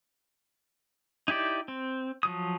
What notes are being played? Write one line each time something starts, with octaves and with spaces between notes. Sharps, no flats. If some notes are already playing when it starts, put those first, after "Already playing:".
D#4 E4 G4 D5
C4
F3 F#3 D#6